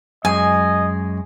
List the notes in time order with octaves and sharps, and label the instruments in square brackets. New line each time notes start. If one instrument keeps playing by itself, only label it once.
[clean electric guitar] F#2 G#3 [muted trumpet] D#5 [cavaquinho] G#5